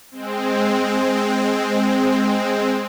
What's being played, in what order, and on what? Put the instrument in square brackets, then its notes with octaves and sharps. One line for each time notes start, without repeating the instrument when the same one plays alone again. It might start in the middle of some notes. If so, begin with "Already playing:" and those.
[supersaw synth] G#3 C4